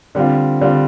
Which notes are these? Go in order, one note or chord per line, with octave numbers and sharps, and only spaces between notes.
D3 G3 C4 F4
D3 G3 C4 F4